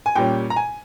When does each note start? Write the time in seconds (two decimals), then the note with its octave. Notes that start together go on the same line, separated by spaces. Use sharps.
0.06 G#5
0.15 A#2 G3 C#4 G5
0.50 A#5
0.56 G#5